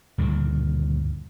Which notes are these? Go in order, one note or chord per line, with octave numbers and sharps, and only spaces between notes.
D2 G2 A#2 D#3